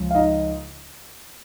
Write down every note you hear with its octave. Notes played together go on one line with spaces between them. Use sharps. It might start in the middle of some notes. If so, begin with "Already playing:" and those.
Already playing: C#2 C#3 F3
F5
D#4 D#5